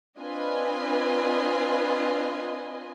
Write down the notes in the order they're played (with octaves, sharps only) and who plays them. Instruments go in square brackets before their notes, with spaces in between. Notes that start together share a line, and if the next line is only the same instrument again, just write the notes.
[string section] C4 D4 F4 B4 D#5 G#5